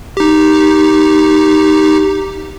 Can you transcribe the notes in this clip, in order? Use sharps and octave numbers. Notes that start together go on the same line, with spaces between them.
D#4 G4